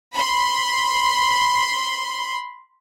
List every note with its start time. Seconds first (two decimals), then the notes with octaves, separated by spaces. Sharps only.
0.13 B5 C6